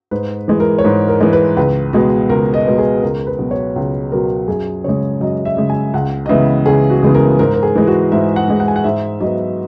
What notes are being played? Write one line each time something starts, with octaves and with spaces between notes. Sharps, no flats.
G#2 B4
E3 G#3
A#4
C#5
G#2 B4
A#4
E3 G#3
B4
C#2 B4
B2 G#3 B3
C#2 A#4
D#5
B2 G#3 B3
G#4
C#2 A#4
B4
B2 F#3 B3
C#5
C#2
B2 F#3 B3 A#4
F#2 G#4
C#3 G#3 C#5
F#2 D#5
E5
C#3 G#3
G#5
C#2 F#5
D#5
C#3 E3 G#3 B3 E5
C#2 G#4
F#4
C#3 E3 G#3 B3
A#4
G#2 A#4
A#4
G#4
E3 G#3
F#4
G#2 E5
F#5
E3 G#3
F#5
G#5
F#5
G#2 E5
F#3 B3 D#5